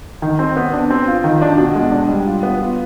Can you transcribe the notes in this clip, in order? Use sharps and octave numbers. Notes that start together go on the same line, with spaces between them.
D#3
C4
B3
D4
C4
F4
D#3
D4
B2
G#3
D4
G3
F4
B3
F4